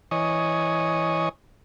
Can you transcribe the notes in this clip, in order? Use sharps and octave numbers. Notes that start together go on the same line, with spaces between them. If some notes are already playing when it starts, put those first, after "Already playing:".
E3 C#5 D#5 G#5 C#6 D#6